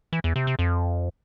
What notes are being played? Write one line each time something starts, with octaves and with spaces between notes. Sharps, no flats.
E3
E2
C3
C3
F2